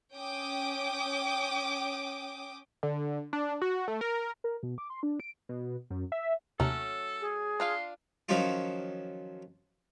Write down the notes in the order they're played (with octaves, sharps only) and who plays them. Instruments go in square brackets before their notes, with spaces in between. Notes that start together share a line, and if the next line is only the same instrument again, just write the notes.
[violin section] C#4 G5 D6 D#6
[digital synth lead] D3
D4
F#4
A3
A#4
[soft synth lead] A#4
B2
D6
C6
D4
D7
[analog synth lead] B2
F#2
E5
[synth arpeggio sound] D#2 C3 [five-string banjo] F#3 A3 C#4 [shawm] A4
[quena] G#4
[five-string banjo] D4 F4 F5 [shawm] C6
[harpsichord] D#3 F3 F#3 C#4 D#4 F4